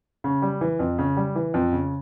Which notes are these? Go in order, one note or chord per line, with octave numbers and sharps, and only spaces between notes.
C#3
G3
E3
F2
C#3
G3
E3
F2
C#3